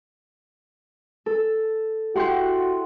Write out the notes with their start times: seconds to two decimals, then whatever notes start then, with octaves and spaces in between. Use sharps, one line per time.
1.26 A4
2.16 E4 F#4 G4 F#5 G5 C6